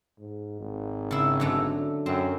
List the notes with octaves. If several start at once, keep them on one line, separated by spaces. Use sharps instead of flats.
G#2
G#1
C#3 E4
D3 F#3 A3
F#2 C4